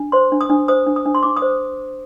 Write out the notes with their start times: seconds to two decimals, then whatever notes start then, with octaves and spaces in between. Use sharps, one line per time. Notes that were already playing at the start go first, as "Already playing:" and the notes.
Already playing: D4
0.12 C5 C6
0.32 D4
0.41 D#6
0.49 D4
0.68 C5 D#6
0.86 D4
0.96 D#6
1.05 D4
1.15 C6
1.23 D4 D6
1.37 D#6
1.42 C5